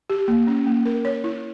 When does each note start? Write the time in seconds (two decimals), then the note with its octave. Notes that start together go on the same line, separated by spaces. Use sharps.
0.10 G4
0.28 A#3
0.47 C#4
0.66 A#3
0.85 A#4
1.05 C#5
1.24 E4